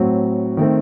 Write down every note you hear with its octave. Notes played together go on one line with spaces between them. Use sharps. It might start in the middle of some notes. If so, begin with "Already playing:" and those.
Already playing: A2 F#3 C4
D#3 A3 C4